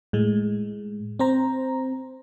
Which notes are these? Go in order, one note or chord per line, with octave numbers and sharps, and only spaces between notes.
A2 G#3
C4 C5 A#5